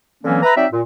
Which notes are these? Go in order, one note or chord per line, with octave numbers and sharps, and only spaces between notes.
D3 E3 F#3 A#3 C4 C#4
B4 E5 A#5
F#3 C4 D#4 D5 E5
A#2